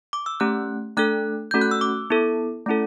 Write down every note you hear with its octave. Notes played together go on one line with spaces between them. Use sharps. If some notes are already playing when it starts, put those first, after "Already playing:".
D6
E6
A3 C#4 G4 F#6
A3 D4 A4 F#6
A3 C#4 F#4 A4 G6
F#6
E6
D6
B3 E4 A4
A3 C#4 E4 A4